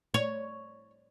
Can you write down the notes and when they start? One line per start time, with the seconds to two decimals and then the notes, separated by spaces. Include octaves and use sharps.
0.14 C#5